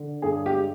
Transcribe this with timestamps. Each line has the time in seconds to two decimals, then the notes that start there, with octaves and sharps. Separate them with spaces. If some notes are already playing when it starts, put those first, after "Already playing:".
Already playing: D3
0.22 G2 G#4
0.46 G4
0.53 G#3